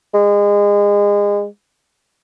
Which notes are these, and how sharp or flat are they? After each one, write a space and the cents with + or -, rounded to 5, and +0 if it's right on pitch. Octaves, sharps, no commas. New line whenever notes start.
G#3 -30